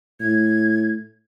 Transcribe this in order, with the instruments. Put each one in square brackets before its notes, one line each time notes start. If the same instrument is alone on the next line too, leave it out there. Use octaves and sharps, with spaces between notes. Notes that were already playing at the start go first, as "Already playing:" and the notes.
[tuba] A2 [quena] G#6